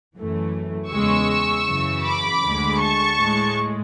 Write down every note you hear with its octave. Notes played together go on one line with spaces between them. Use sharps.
F#2 E3 A3
E2 C#3 G#3 C#6 E6
F#2 C#3 E3
B5 D6
D2 D3 G#3
A5 C#6
A2 G#3